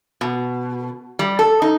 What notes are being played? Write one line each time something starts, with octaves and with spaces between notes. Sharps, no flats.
B2
G3
A4
D#4